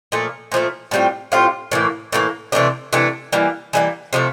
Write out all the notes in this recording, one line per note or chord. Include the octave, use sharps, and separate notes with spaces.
A#2 F3 A3
A#2 F3 A3
A2 G3 C4 F4
A2 G3 C4 F4
A2 E3 A#3
A2 E3 A#3
C3 E3 A3 D4
C3 E3 A3 D4
E3 G3 A#3
E3 G3 A#3
C3 F3 A3